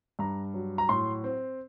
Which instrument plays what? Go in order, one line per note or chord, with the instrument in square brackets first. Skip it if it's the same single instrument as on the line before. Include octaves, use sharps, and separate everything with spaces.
[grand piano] G2 A#5
F#3
A#5
A2 C6
C4